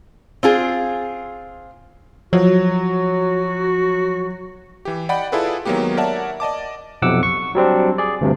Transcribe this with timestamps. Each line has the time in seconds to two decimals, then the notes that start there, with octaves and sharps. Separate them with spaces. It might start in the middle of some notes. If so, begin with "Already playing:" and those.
0.43 C4 F4 G#4
2.33 F3 F#3 F#4
4.85 E3 G4
5.09 D5 D#5 F#5 G5 B5
5.32 E4 F4 G#4 A4 B4 D5
5.65 D#3 F#3 G#3 A#3 B3 G4
5.97 A#4 C#5 D5 E5 F#5 A5
6.40 D5 D#5 A5 D6
7.02 B1 F2 C3 F#5 D6 E6
7.23 C#6
7.55 F#3 G3 C4 D4
7.98 G#4 D5
8.21 D2 G2 C3